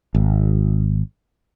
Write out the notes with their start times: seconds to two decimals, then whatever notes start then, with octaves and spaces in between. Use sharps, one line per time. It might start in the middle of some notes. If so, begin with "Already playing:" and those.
0.15 G#1